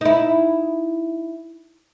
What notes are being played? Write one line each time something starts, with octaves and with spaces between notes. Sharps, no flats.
D#4 E4